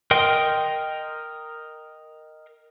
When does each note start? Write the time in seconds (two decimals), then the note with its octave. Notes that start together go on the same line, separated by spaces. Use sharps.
0.11 A#4 D#5 G5 C6